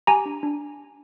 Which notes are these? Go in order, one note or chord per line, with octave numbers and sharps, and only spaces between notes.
G4 G#5 A#5
D4
D4